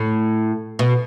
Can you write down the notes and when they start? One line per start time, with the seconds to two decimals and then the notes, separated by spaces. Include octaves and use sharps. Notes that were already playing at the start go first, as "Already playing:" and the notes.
Already playing: A2
0.79 B2